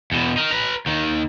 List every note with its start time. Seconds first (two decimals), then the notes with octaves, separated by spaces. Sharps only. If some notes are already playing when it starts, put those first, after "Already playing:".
0.12 E2 B2
0.37 D#4 A#4
0.52 B4 A#5
0.86 D#2 D#3